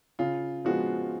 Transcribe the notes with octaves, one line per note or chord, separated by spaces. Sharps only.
C#3 F4
F3 G#3 B3 F#4